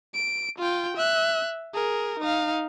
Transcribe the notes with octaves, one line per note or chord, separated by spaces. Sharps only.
D7
F4 G5
E5 F#6
G#4 A#4
D#4 F5